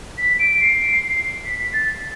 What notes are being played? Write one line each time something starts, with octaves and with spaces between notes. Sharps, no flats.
B6
D7
C7
B6
B6
A6